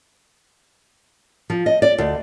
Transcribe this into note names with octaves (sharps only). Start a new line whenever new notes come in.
F3
D#5
D5
D2